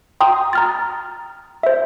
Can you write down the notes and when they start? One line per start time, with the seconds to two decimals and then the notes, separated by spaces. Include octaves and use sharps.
0.21 G5 A#5 C6 D#6
0.53 A#5 F6 A6
1.63 C5 E5